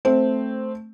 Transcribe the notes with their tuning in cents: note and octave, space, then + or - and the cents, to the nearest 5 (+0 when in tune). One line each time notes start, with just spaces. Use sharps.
A3 +0 C4 +0